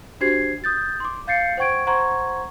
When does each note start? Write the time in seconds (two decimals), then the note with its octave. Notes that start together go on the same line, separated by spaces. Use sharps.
0.21 D4 F#4 G4 C5 G#6 C7
0.64 D#6 G6 A6
1.00 C6 D6
1.27 F5 G6 A6 C7 C#7
1.57 C5 F#5 G5 C#6 G#6 D7
1.87 C5 F#5 A#5 C6 C#6 G#6